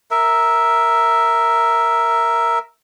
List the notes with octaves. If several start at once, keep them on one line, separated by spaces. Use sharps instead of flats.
A#4 E5